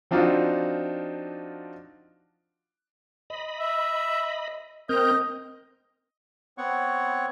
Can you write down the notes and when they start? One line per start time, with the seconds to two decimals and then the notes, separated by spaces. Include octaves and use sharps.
0.11 F3 C4 D4 D#4 F4 F#4
3.30 D#5 B5
3.59 E5
4.89 C4 A#4 D#5 G6
6.58 B3 C4 C#5 F#5 C#6